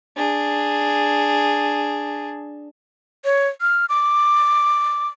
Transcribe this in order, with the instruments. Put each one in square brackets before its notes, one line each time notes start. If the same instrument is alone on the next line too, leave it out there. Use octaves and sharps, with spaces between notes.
[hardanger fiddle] D4 G#4
[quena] C#5
F6
D6